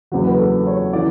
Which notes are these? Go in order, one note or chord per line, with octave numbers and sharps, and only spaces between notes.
F#1 E2 C#3 F#3 F#4
B4
A4
C#5
C#3 E3 D5